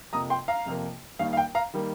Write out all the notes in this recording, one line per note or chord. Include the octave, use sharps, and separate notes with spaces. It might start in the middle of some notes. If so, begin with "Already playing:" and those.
F2 C3 F3 A#3 A#5 D#6
G5 C6
F5 A#5
F2 C3 F3 A#3
D#2 D#3 G3 A#3 F5
F5
G5
F5 A#5
D#3 G3 A#3